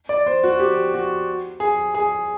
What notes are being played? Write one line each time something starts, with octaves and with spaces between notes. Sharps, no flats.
D5
C5
F#4
G4
F#4
G#4
G#4